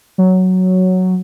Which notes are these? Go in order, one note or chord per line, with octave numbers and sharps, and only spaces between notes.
F#3